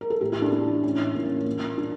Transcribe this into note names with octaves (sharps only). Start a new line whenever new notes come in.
A#4
A4
A2 E3 G4
E4
D4
A2 E3 D4
A2 E3 C#4
A2 E3 A#3
C#4
A#3
A#2 A#3
A#2 D4